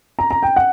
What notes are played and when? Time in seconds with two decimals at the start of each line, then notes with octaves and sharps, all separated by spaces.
0.19 A#5
0.31 A#5
0.43 G5
0.56 F#5